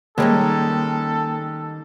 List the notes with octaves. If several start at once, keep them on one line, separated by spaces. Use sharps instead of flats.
D#3 G3 G#3 A#3 C#4 D#4 A4